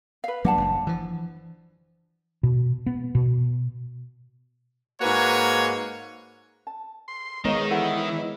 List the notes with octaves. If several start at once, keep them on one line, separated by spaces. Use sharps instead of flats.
B4 F5
F#3 G3 A#3 D4 F#5 A5
F#1
E3 F3
B2
B3
B2
G#2 A#3 F#4 B4 C#5 G#5
A5
C6
D#3 G#3 B3 D#4 A#4 C#5 D#5 F5
E3 A4 C5 F#5
D#5